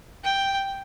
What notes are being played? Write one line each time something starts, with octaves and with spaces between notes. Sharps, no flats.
G5